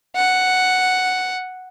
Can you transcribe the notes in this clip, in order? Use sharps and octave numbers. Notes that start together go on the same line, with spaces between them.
F#5